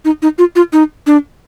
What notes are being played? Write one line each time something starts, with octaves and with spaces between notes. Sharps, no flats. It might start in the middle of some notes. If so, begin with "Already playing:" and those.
D#4
D#4
F4
F4
D#4
D4